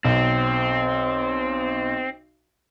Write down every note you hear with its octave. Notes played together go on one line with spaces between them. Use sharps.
B1 C4